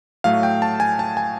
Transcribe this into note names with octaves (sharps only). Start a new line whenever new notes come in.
A2 F#3 A3 F5
G5
A5
G#5
A5
G#5